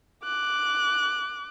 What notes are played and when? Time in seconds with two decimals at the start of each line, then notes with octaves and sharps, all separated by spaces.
0.24 D6 F#6